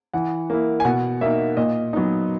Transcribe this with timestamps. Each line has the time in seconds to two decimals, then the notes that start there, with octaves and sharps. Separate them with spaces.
0.14 E3 F#5
0.50 A#3 E4
0.80 G#5
0.85 B2 F#5
1.21 A#3 D#4 E5
1.57 A#2 D#5
1.93 F#3 B3 D#4